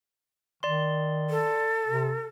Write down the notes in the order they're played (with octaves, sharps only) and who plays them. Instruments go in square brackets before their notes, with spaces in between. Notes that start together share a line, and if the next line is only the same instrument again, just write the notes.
[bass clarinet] D#3 [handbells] D5 C6
[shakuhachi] A4
[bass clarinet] C3